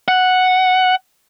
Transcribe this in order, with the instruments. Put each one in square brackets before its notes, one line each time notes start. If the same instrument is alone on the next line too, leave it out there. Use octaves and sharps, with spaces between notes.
[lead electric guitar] F#5